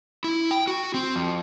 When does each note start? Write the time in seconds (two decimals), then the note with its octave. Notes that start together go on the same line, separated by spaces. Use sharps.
0.24 E4
0.51 G5
0.67 F#4
0.94 C4
1.16 F2